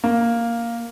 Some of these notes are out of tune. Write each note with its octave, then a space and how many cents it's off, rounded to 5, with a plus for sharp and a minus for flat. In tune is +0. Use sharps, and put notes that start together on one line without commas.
A#3 +0